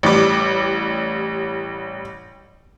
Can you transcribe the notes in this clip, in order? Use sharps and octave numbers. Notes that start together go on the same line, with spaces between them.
A1 G3 D6